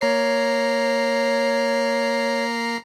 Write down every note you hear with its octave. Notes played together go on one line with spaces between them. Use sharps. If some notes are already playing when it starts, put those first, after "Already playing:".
A#3 C#5 A#5 C7